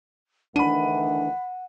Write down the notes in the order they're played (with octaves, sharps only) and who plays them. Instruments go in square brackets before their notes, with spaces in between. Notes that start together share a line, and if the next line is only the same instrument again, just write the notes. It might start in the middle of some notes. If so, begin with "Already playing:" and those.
[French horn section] D2 D#3 E3 [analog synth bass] D4 [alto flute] F#5 [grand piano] B5 D#7